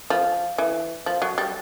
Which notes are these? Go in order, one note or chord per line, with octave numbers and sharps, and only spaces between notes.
F3
E3
F3
F#3
G3